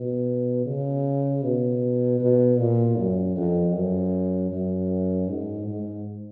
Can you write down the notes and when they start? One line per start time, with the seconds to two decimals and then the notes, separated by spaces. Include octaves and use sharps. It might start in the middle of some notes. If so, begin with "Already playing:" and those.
Already playing: B2
0.66 C#3
1.42 B2
2.20 B2
2.59 A#2
2.98 F#2
3.36 F2
3.74 F#2
4.51 F#2
5.29 G#2
5.67 G#2